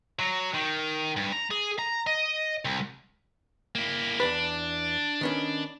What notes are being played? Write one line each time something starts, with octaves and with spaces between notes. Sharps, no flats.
F#3
D#3
G2
A#5
G#4
A#5
D#5
C2
A#3 E4
E2 D4 B4
D#3 B3 C#4